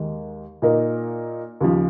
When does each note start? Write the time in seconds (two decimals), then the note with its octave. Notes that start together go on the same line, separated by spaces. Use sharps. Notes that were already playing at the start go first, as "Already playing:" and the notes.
Already playing: D#2 D#3 G#3
0.62 A#2 A#3 D#4 A#4
1.61 D#2 C#3 F3